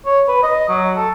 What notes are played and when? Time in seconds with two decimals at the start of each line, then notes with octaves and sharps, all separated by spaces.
0.06 C#5
0.28 B4
0.43 D#5
0.68 F#3
0.96 A4